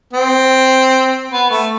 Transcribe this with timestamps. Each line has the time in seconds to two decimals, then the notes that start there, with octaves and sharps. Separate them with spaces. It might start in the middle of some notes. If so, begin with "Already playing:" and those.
0.13 C4
1.30 B3
1.50 A3